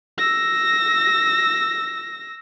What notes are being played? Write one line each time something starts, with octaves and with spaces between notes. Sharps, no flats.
E6 A#6